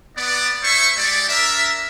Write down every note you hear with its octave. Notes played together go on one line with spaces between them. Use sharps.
B3 D5
E4 C5 E5 C#6
G#3 G4 D5
D4 A#4 E5